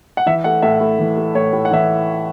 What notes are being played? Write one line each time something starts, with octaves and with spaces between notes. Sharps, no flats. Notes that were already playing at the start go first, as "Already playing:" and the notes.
F#5
E3 E5
A3 F#5
A2 E5
A2
E3
A3
A2 C#5
A2
F#5
E3 E5